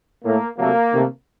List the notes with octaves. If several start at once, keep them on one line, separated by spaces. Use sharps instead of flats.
A2 A3 A#3
C3 F#3 A3 A#3
C3 D#3 A3